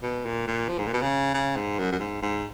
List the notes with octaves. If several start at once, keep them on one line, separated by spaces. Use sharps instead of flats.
B2
A#2
A#2
F3
G#2
A#2
B2
C#3
C#3
G#2
F#2
F#2
G#2
G#2